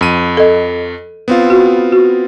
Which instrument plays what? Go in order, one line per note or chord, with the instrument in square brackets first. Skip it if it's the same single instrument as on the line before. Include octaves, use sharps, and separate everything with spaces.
[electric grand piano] F2 D#7
[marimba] A4 D#5
[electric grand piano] B3 C4 F4
[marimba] F#4
F#4